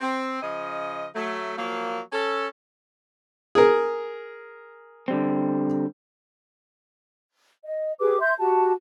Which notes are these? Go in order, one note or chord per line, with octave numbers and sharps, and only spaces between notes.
C4
C#3 F3 D#5
F#3 A3
F3 F#3 A#3
C#4 A4
G#4 A#4
D3 G3 C4
D#5
G4 G#4 B4 D6
E5 C6 G6
F#4 G4 A5